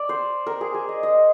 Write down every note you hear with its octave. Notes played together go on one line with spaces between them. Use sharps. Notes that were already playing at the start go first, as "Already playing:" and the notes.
Already playing: D5
C5
A#4
G#4
G#4
D#5
D#5